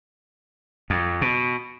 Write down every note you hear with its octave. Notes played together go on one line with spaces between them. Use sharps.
F2
B2